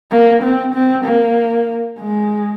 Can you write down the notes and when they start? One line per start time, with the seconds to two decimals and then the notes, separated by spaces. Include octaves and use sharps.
0.11 A#3
0.43 C4
0.74 C4
1.05 A#3
1.98 G#3